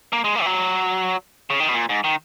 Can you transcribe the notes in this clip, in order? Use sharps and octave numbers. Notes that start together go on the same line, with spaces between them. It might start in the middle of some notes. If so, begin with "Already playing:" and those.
A#3
G#3
A#3
E3
F#3
C#3
D#3
B2
A#2
G#2
D#3